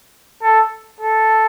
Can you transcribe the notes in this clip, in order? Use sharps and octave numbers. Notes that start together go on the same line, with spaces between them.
A4
A4